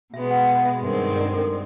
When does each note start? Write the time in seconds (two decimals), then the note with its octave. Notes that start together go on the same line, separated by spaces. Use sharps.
0.13 B2 G#3 B3 E5
0.31 F#5
0.48 F#5
0.65 E5
0.81 G2 D#3 G#3 C4
1.16 D5
1.33 A4